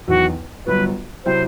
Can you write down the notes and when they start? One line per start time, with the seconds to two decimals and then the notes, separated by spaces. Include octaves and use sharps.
0.08 E2 D#3 F#3 F#4
0.66 G1 G2 F#3 B3 F#4 B4
1.25 C3 F#3 C4 E4 C5